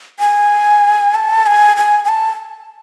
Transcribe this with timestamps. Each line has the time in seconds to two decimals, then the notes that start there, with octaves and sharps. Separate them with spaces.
0.20 G#5
1.15 A5
1.46 G#5
1.77 G#5
2.05 G#5
2.09 A5